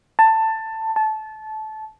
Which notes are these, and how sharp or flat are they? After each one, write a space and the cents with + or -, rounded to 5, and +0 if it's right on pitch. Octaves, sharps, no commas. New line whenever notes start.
A5 +15
A5 -20